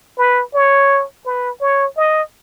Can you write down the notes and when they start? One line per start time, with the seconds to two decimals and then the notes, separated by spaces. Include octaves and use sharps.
0.18 B4
0.55 C#5
1.26 B4
1.62 C#5
1.97 D#5